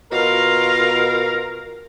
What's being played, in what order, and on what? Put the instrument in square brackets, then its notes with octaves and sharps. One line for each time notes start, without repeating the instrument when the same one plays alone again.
[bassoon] B2 [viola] F4 F5 [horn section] A#4